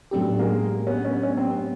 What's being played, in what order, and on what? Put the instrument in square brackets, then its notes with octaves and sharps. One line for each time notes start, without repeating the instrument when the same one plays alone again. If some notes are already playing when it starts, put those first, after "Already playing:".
[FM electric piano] A2 F#3 A3 D4 G4 [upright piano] C4
[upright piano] B3
G#3 A#3
B3 C#4
B3 C#4
C#4
C4
B3